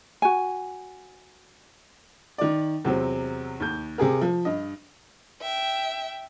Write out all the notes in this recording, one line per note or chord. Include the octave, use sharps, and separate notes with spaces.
F#4 G#5
D#3 D5
E2 C3 F#3 C4
D#2 G6
C3 G4 G#4 A#4
F3
G2 D#5
E5 G5